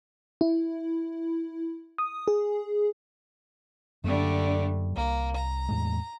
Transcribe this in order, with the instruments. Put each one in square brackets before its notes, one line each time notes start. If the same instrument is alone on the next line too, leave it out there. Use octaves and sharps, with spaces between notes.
[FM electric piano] E4
D#6
G#4
[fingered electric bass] F#2 F#3 A#3 [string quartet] D3 G3 A3
[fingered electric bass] C2 [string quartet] A#3
[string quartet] A#5
[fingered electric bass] E2 A2 G#3